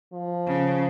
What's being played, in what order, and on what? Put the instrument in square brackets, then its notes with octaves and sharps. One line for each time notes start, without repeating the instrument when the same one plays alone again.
[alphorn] F3
[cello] C#3